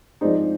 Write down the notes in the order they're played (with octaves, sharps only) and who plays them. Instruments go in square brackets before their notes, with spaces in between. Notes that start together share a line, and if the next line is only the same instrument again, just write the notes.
[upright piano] F3 G#3 C4 D#4 C5 D5